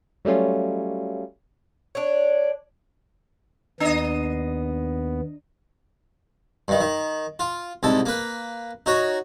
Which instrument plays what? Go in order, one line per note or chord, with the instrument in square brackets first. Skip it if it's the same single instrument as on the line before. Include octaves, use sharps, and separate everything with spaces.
[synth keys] F#3 G3 A3 C#4 F4
[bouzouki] D4 C#5
[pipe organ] D#2 B3 [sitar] D4 D#5
[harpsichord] G2 D#3
D#3
F4
C2 G#2 A4
A#3 B4
D#4 F#4 C#5